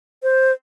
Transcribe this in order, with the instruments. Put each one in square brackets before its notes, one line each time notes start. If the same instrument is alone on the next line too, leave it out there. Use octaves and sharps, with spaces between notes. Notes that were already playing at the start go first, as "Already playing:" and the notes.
[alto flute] C5